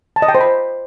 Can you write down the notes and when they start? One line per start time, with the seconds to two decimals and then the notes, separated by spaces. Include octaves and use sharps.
0.16 A5
0.22 D#5
0.28 G5
0.35 C5
0.41 B5